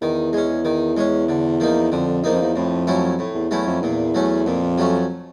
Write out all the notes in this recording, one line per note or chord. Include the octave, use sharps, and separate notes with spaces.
E2 D#3
G#3 C#4
D#3
G#3 C#4
D3
F3 A#3 D#4
F2 D3
E2 F3 A#3 D#4
F2
E2
F2 A2
F#3 A3 C#4 E4
A2
E2
E2 F#3 A3 C#4 E4
F2
E2 A#2
F#3 A3 C#4
F2 A#2
F#3 A3 C#4